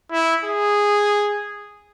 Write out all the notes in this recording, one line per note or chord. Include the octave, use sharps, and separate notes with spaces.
E4
G#4